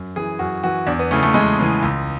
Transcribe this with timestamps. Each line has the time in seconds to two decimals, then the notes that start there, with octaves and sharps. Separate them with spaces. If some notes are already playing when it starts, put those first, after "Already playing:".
Already playing: F#2
0.16 E3 G#4
0.39 F#2 F#4
0.64 E3 F#4
0.87 E2 D4
0.99 B3
1.11 C#3 E3 A3
1.23 A3
1.34 E2 G#3
1.59 C#3 E3
1.82 C#2